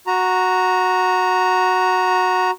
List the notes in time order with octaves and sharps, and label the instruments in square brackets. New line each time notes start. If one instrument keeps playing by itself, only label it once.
[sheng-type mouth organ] F#4 A#5